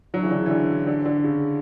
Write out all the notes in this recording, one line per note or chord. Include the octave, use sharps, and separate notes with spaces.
D3 F#3
C#3 E3
D3
C#3
E3
D3
D3
D3
C#3